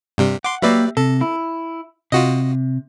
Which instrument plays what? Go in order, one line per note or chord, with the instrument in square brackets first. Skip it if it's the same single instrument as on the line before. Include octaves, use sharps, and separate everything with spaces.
[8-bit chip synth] G2 C3 G3
[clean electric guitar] F#5 [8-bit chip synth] C6 D6
[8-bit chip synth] F#3 B4 D5 [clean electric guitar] A#3 G4 E5
[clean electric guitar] C3 [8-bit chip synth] A4
[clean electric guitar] E4
[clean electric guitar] C3 [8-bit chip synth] F4 F#4 D#5